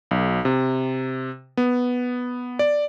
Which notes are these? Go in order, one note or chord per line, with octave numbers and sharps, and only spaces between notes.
B1
C3
B3
D5